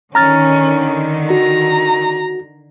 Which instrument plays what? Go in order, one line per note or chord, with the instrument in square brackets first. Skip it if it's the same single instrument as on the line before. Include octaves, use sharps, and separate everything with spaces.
[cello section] D3 D#3 [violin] C#4 [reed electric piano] A#5 F6 A6
[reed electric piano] F#4 [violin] A#5